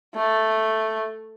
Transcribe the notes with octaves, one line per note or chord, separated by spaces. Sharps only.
A3